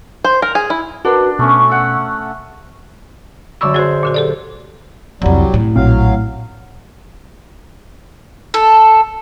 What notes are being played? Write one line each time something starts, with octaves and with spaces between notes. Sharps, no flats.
C5
A#4
G#4
E4
D4 F#4 A#4 B4
B2 A3 C#4
E5 F#5
F#2 D3 B5 C#6 D6 E6
F#3 F#4 G#4 C5
A#2 D3 F#4
G4 A4 D5
C2 F2 F#3 G3
A2
A#1 F#3 C4 F5
A4